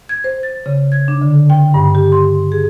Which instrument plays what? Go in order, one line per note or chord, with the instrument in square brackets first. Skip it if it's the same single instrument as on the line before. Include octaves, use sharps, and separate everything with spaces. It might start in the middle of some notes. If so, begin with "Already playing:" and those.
[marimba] G#6
C5
A6
C#3
G#6
D4
D3
G5
G2
G4
C6
G#4